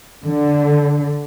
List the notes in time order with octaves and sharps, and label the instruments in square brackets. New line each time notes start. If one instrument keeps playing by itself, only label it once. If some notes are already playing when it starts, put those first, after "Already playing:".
[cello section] D3